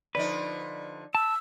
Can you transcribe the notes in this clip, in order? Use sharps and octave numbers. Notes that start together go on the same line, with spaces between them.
D3 F3 D#4 B4 D5
A5 E6